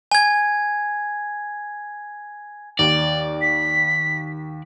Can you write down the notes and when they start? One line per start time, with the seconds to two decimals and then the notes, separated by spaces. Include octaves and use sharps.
0.12 G#5 G#6
2.79 D#2 D5
3.41 B6